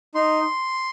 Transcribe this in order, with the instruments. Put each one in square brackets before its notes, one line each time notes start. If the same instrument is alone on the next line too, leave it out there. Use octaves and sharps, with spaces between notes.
[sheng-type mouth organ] D#4 C6